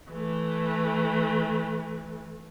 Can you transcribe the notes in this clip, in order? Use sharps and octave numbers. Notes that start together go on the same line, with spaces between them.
E3 A3